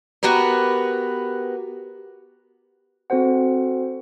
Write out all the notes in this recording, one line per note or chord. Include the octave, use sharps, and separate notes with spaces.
B3 F#4 G4 A#4 B4
C4 F#4 A4 C5 F#5